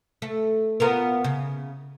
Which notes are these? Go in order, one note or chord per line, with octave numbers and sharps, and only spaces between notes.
A3
B3 F4 A#4
C#3